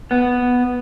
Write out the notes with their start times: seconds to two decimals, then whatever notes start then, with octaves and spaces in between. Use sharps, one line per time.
0.11 B3